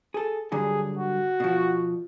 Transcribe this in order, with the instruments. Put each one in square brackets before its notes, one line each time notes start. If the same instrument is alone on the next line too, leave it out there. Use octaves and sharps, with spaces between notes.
[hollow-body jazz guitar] G#4 A4
[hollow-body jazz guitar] G2 D3 F#3 [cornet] G#4
[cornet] F#4
[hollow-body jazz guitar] B2 F3